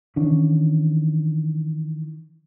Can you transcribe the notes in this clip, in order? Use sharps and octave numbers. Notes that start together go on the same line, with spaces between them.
D#3 E3 C#4 D4